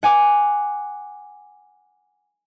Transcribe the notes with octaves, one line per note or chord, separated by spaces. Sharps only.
F#5 G#5 D6